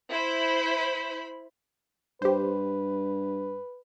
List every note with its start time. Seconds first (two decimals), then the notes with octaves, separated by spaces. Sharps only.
0.11 E4 C5 B5
2.22 G2 G4 B4 C5